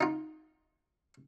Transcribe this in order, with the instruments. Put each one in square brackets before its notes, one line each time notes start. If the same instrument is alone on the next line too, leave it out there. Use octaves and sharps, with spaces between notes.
[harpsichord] D#4 F4